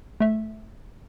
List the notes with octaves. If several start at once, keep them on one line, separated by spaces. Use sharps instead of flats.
A3 E5